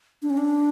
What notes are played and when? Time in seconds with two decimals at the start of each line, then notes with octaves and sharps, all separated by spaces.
0.22 D4
0.30 C#4
0.37 D4